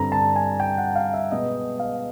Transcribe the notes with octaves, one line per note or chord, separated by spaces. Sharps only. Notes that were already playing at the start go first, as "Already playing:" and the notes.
Already playing: G2 D3 G3 C4 A#5
A5
G#5
G5
F#5
F5
E5
B2 G#3 B3 D#5
F5